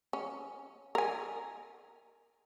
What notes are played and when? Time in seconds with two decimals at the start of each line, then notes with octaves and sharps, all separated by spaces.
0.13 C#4
0.95 A#4 G#5